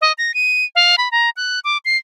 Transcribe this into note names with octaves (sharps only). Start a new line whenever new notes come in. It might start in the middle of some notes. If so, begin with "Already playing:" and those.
D#5
A#6
D#7
F5
B5
A#5
F#6
D6
C7